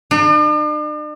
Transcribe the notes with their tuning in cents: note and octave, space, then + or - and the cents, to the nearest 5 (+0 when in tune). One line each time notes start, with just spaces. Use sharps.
D4 +45